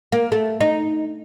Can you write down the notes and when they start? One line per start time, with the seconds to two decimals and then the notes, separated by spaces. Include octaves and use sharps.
0.12 A#3
0.32 A3
0.61 D#4